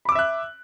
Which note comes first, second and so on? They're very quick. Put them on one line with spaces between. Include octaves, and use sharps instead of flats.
B5 D6 E6 E5 F#6